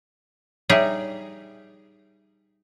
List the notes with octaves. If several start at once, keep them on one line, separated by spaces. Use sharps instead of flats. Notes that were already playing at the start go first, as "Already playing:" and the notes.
G3 D#4 G#4 C#5 E5